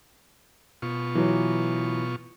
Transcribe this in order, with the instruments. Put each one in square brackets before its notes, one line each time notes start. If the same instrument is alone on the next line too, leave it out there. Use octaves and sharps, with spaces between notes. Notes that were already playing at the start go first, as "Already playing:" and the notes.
[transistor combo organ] B2 F4 C#6
[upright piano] E3 F#3